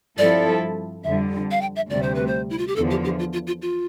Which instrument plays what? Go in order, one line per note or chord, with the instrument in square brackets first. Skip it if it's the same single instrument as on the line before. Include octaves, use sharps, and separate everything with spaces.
[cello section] G2 F3 C4 E4 A4 [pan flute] D5
[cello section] F2 D3 G3 [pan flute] E5
[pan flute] F5
G5
E5
[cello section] D2 C3 G3 [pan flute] D5
[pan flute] C5
B4
C5
E4
F4
G4
[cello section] E2 D3 F3 [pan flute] A4
[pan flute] G4
G4
F4
F4
F4
F4